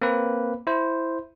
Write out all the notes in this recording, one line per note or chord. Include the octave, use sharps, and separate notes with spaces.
A#3 C4 B4
E4 C5